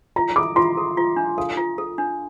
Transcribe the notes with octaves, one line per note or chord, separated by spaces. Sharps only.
F4 A#5
A4 D6
F4 C6
A4
F4
D4
A4 F5
F4
A4
D4